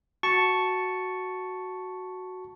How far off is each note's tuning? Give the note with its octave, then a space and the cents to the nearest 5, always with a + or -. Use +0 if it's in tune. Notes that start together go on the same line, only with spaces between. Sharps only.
F#4 +0 A5 +0 C#6 +0